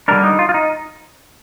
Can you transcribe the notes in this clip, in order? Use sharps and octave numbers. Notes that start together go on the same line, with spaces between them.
D3 G3 D4 A#4
D#4
F4
F4
D#4